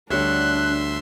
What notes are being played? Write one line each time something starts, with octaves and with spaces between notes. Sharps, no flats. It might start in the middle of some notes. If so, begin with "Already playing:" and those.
D2 D3 G3 D4 C#5 E5 C6 F#6